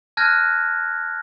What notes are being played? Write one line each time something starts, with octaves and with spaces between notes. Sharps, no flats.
A5 F6 F#6 G#6 A#6